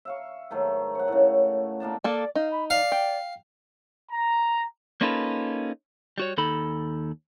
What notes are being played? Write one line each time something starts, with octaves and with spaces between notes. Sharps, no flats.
E5 F5 C#6
G#2 D#3 F#3 A3
C#5 F#5
A2 C#3
A#2 A#3 D4 A5
A#3 A4 D5
D#4 F5
B5
D5 F5
G5
A#5
A#3 C#4 D#4 F4 A4 B4
G3 F#4 C#5
D#2 D#4 A4 B5